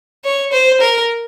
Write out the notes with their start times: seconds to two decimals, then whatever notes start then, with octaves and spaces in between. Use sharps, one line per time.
0.25 C#5
0.52 C5
0.81 A#4